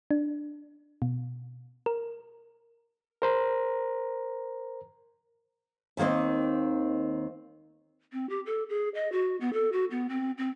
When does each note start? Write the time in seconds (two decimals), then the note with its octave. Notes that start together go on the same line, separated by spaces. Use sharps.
0.11 D4
1.02 B2
1.86 A#4
3.22 A#4 C5 A#5
5.97 D#2 D#3 A#3 C4 D#5
8.12 C4
8.29 G4
8.46 A4
8.69 G#4
8.95 D#5
9.12 F#4
9.40 B3
9.53 A4
9.72 F#4
9.91 B3
10.09 C4
10.38 C4